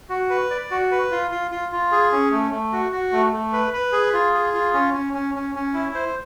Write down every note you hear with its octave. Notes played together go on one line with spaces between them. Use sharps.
F#4
B4
D5
F#4
B4
F4
F4
F4
F4
G#4
C#4
A3
A3
F#4
F#4
A3
A3
B4
B4
G#4
F4
G#4
F4
C#4
C#4
C#4
C#4
C#4
E4
C5